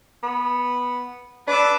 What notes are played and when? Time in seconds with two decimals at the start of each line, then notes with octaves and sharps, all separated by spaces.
0.23 B3
1.47 D4 B4 D6 E6